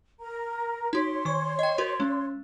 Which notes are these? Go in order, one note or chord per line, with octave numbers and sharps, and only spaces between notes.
A#4 A#5
D#4 F#4 C#5 C6
D#3 C#6
D#5 G5
F#4 A#4 C5
G#3 C#4